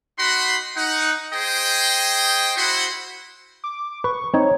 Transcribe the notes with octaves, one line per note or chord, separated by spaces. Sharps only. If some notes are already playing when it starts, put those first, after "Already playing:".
D#4 F#4 F#5 B5 C6
D#4 F#5
G#4 C5 D#5 G5
E4 F#4 C5 F#5 B5 C6
D6
B4 C#6
C4 D#4 C#5